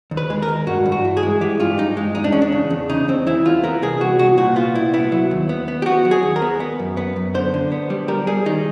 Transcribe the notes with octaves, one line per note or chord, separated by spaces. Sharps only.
D#2
B4
G#3
A#4
D#2
G2 F#4
G2
F#4
E3
G#4
G#3
E3 G4
G2 F4
G2 D#4
G#3
E2 D#4
D4
E2 C#4
D4
C#3
E2
C#3 D#4
E2 C4
E3 E4
E2 F4
B3 A#4
C2 G#4
C2 F#4
C2 F#4
A#2 F#4
B3 F4
C2 E4
B3 E4
F#3
D#2
B3
B3
G4
B3 F#4
F#3
G#4
D#2
A#4
B3
B3
F#2
B3
F#2
D3 C5
D3
B3
G3
G3 A#4
G3 G#4
D#3 D#4